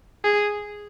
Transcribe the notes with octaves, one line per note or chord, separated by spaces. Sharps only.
G#4